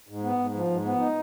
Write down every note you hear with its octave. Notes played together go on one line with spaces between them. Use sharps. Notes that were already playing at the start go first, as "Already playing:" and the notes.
G#2
B3
G#2
F3
G#2
B3
D#4